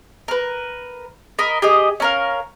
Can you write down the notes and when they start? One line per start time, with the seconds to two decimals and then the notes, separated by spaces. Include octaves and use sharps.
0.28 A#4 B4
1.39 A#4 D#5 B5
1.62 G4 G#4 D#5
2.00 C#4 A#4 F5